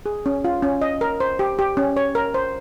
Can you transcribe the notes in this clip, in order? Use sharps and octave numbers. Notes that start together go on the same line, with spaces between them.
G#4
C#4
F4
C#4
D#5
A#4
C5
G4
G4
C#4
C#5
A#4
C5